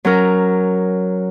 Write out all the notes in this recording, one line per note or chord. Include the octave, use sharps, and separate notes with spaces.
F#3 C#4 A#4